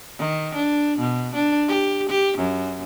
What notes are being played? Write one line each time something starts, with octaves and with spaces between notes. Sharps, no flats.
D#3
D4
B2
D4
G4
G4
F#2